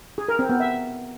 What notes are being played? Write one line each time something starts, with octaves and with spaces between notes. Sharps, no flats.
G#4
A#4
C4
B3
E5